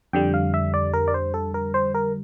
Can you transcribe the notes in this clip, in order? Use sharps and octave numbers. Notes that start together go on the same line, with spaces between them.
F2 D3 G3 G5
F5
E5
D5
A#4
D5
C5
A4
A#4
C5
A#4